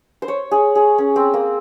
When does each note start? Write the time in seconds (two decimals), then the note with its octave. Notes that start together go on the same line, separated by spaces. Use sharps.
0.22 C5
0.28 C#5
0.51 G#4
0.75 G#4
0.98 C#4
1.16 C4
1.34 A#3